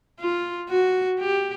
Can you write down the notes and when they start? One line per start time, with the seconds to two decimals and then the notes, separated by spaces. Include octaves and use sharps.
0.20 F4
0.69 F#4
1.20 G4